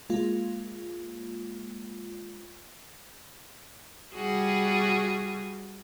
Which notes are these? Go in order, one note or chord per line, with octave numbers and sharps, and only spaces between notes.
G#3 A#3 F4
G3 F#4 G#4